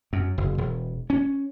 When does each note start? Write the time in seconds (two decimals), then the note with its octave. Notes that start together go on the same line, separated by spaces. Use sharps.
0.13 F#2
0.38 F#1
0.58 E1
1.10 C#4